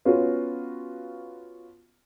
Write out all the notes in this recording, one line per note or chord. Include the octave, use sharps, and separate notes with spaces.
B3 C#4 F4 F#4